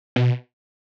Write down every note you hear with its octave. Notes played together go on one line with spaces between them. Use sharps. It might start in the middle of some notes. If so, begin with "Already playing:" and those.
B2